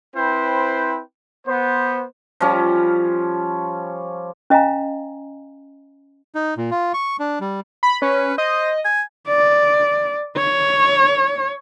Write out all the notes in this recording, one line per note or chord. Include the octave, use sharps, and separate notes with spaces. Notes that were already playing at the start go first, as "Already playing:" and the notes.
C4 E4 B4 C5 G5
B3 C5
F3 G3 C#4
C#4 D#5 F5 G#5 A#5
D#4
A#2
F4
C#6
D4
G3
B5
C#4 B4
C5 D#5
G#5
D5
C#5